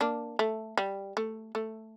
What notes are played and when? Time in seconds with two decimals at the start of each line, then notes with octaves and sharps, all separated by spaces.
0.01 A#3 D4
0.39 A3
0.77 G3
1.17 A3
1.55 A3